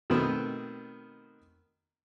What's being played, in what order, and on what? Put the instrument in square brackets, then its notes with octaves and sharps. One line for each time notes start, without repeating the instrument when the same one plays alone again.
[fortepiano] B2 D#3 A3 B3 C4